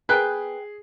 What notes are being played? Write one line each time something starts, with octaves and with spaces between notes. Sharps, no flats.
B3 G#4 A#4 B4 G5 F#6 G6